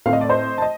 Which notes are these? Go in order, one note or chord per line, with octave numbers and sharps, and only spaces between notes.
A2 A3 C4 F5
D#5
D5
C5 D#5
A5
D#5